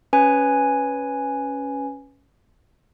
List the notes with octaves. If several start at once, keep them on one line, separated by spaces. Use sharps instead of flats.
C#4 B4 G#5